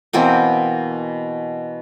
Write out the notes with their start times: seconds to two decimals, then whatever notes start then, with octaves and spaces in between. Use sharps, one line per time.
0.13 B2 E3 A#3 C4